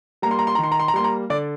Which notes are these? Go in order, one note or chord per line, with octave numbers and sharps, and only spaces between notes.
G3 A#3 A#5
C6
A#5
C6
A#5
D#3
C6
A#5
C6
A#5
G3 A#3 C6
A#5
D3 D5